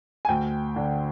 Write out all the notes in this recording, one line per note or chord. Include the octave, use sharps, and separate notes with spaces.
G#5
D2 G5
D3